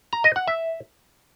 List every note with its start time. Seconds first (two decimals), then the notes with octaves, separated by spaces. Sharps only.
0.13 A#5
0.24 D#5
0.36 F#5
0.48 E5